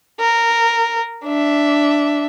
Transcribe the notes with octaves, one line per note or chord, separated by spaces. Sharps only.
A#4
D4 E5